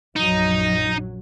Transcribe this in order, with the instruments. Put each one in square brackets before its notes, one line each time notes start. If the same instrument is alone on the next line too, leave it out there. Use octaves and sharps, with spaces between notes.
[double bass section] A#1 F#2 F#3 [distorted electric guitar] D#4